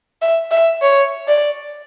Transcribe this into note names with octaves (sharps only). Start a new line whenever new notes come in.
E5
E5
C#5
D5